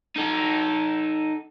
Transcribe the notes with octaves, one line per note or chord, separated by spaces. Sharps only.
D#4 A4